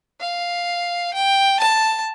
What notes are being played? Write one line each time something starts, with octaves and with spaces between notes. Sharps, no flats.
F5
G5
A5